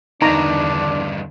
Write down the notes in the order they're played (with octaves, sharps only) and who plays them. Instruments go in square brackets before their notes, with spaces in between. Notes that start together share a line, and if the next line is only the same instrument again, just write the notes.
[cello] E2 D3 [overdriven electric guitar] G2 D#3 [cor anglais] D4 [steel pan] D#4 A#5 C#6